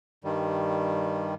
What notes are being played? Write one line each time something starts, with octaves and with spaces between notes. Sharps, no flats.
G2 D#3 G3